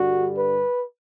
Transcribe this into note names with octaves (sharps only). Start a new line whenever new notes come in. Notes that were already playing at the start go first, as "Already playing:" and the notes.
Already playing: G2 D3 G3 F#4
B4